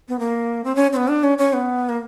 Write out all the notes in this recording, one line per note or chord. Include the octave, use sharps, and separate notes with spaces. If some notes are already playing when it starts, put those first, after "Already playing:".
B3
A#3
C4
C#4
C4
B3
D4
C#4
C#4
B3
A#3